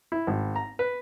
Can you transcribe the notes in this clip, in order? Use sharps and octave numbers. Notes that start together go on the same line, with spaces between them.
E4
G#1
A#5
B4